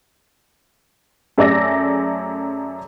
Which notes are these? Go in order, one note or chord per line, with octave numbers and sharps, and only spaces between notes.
F#2 A3 G#4 D5 E6 A#6